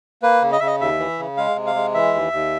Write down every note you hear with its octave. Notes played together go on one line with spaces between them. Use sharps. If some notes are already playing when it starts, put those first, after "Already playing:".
A#3 B4
C#3
D#5
C#3 E5
D#5
D#2 E5
E3
C#3
G#3 F5
C3
F5
G#3
E3 E5
D#2
D#2